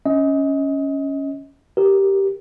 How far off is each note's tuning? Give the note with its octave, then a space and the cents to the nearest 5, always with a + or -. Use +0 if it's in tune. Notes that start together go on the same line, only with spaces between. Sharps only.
C#4 +0 D#5 +30
G4 -5 A#4 +0